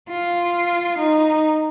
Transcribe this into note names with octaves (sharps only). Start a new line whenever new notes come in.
F4
D#4